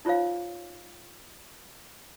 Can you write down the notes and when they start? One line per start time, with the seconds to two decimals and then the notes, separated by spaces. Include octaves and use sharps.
0.05 D#4 F4 C5 C#5 F5